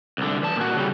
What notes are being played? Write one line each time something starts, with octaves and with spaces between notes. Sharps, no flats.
C2 D3
E3 A5
A#2 F#4
C#3 G3